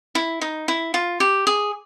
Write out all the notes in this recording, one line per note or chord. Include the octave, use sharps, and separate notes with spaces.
E4
D#4
E4
F4
G4
G#4